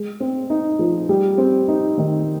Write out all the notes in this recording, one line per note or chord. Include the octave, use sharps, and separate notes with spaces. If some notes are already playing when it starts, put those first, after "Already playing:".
Already playing: G#3
C4
D#4
F3
G3
C4
D#4
D#3